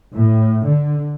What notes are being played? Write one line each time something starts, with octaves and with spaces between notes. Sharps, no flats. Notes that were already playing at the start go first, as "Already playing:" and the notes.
A2
D3